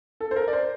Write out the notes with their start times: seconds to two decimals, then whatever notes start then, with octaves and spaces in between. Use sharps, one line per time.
0.20 A4
0.31 C5
0.36 A#4
0.48 D5
0.53 C5